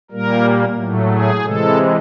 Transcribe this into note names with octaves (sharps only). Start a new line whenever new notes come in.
A#2 G3 A#3 A#4
A2 F#3 A3
G#4
C3 E3 G#3 A4